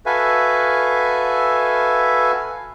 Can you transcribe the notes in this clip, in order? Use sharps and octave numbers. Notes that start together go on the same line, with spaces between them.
F#4 A4 B4 E5 F5 G#5